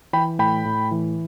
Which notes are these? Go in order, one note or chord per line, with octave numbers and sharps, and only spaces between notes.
E3 G5 B5
A2 G5 B5
A2
E3